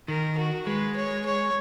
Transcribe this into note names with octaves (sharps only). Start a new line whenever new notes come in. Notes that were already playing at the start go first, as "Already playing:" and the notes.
D#3 A#4
F#4
G#3 B4
C#5
C#5